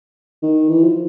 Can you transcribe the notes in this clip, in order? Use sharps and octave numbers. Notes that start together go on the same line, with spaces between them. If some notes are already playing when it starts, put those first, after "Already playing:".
D#3
E3
F3